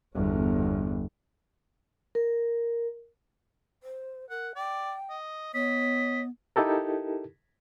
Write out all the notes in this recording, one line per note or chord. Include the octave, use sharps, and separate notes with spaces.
G1 E2
A#4
C5
A#4 F#5
D5 G5
D#5
B3 C#5 D#5 B6
D#4 E4 G4 A4 A#4